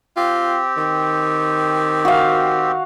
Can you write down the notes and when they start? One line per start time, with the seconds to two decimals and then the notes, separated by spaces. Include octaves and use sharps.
0.17 C4 F4 G4
0.77 D#3
2.05 F#4 F5